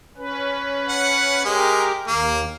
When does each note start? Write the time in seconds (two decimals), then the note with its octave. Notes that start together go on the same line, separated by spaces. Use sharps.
0.17 C#4 B4
0.89 F#5
1.45 G#3 G4 A#4
2.07 D#2 A#3